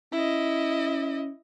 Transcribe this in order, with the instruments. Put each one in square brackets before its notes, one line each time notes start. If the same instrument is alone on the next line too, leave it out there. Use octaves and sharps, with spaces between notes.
[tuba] C#4 [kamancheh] E4 D#5